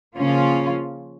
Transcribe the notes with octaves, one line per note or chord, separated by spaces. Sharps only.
C#3 F3 A#3 C#4 F4